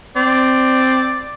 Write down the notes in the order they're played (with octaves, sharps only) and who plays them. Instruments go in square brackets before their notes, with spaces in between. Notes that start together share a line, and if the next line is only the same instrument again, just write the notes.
[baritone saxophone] C4 [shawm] D5